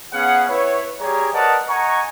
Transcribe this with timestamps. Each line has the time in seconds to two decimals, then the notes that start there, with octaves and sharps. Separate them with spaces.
0.13 B3 C#4 G#4 F5 F#5
0.49 E4 B4 C#5
1.01 G3 G4 G#4 C#5 A#5
1.34 A#4 B4 D5 D#5 F#5 A5
1.69 D#5 F#5 G#5 A#5 C#6